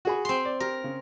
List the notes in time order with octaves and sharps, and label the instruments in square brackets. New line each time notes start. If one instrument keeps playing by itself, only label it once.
[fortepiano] F#4 G#4 B5
[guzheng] C4 C6
[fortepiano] D5
[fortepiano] G4 [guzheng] A#4
[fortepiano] C#3